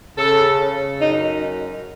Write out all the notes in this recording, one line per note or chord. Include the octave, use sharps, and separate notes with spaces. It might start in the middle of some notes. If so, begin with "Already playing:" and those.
C#3 A4
C#3
F#2 D#4